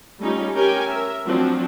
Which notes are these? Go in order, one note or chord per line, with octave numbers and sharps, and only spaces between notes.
G3 A3 C#4 D#4 F4 G4
C#4 G4 A#4 G5 G#5
A#4 E5
F3 F#3 A3 C4 D4 F#4